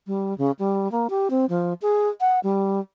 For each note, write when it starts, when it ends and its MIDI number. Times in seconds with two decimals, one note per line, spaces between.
0.07 0.36 55
0.38 0.51 49
0.59 0.90 55
0.91 1.07 58
1.10 1.28 67
1.30 1.45 60
1.49 1.73 53
1.82 2.08 68
2.20 2.39 78
2.43 2.80 55